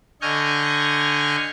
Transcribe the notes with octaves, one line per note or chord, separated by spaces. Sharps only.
D3 D#5 G#5 C#6 F6 G6